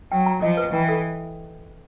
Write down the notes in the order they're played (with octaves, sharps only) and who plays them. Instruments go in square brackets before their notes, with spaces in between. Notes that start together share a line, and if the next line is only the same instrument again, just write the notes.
[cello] F#3 [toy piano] G5
[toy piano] A#5
[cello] F3 [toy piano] D#5
[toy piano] B4
[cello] E3 [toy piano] G5
[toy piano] A4